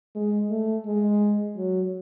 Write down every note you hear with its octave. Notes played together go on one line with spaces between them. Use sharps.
G#3
A3
G#3
F#3